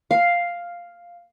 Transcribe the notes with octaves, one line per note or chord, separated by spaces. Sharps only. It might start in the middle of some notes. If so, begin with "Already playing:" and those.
F5